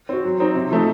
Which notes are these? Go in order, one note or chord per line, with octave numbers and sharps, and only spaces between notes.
C4 F#4
F#3
C4 D#4
C3
F3 A3 D#4